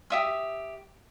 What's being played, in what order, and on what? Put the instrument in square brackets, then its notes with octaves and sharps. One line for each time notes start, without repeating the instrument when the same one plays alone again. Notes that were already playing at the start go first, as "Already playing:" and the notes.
[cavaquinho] G4 E5 D#6